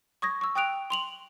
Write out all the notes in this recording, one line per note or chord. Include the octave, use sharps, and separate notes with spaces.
C#6 D#6 G#6 A#6
C#6 E6
G5 D#6 F#6 D7 F7
C6 F7 F#7